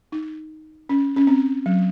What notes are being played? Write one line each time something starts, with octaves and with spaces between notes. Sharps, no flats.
D#4
C#4
C#4
C4
F#3